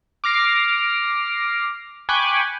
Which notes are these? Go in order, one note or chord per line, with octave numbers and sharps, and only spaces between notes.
D6 F6 A#6 C7
G5 G#5 B5 C#6 D6 F#6